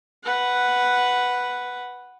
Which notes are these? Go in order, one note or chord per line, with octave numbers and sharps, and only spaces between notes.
B4 F#5